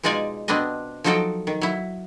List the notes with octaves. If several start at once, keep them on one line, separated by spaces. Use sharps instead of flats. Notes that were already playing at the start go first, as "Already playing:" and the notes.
B2 G#3 D#4 F4 D5 G#5
B2 B3 C4 D4 D#5
F3 F#3 D#4 F#4 A4 G5
D#3
F#3 E4